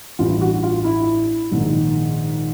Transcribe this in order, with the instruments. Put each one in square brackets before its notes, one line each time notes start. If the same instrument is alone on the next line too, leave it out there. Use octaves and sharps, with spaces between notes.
[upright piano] A1 G2 E3 F4
F#4
F4
E4
A#1 G#2 D#3